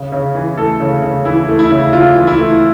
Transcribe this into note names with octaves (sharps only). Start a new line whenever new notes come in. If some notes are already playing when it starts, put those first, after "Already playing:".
Already playing: C#3
C#3
E3
A3 A4
C#3
C#3
E3 E4
A3
E4
C#3
C#3 F4
E3
E4
A3